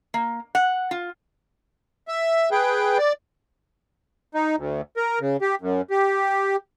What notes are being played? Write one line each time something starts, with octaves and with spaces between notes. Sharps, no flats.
A#3
F#5
F4
E5
G#4 B4 G5
D5
D#4
D2
A#4
C#3
G4
F#2
G4